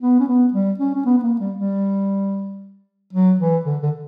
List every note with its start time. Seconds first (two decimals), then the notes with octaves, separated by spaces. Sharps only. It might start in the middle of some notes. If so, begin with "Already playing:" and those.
0.02 B3
0.20 C#4
0.28 B3
0.53 G3
0.79 C#4
0.95 C#4
1.06 B3
1.18 B3
1.23 A#3
1.40 G3
1.57 G3
3.13 F#3
3.40 E3
3.65 D3
3.83 D3